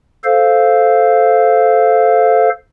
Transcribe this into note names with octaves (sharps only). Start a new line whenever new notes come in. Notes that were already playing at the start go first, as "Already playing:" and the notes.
A4 C5 F5